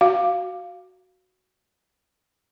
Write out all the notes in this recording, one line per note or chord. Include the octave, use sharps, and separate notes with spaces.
F#4 F5